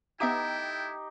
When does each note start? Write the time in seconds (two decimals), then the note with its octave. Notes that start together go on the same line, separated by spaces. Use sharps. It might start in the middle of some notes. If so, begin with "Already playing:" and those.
0.20 A3 B3 D#4 E4 G4 E5 G5 D7